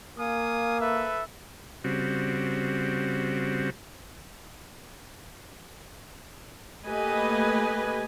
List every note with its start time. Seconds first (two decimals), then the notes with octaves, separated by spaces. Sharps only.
0.18 A#3 F5 G#5 D#6
0.81 A4 B4 E5
1.84 C#3 G3 C4 F#4
6.86 A3 A#3 G4 B4 D#5 G#5